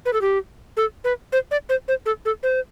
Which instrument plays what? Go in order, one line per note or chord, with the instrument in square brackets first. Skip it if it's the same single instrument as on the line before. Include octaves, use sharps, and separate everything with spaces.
[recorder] B4
A4
G4
A4
B4
C5
D5
C5
C5
A4
A4
C5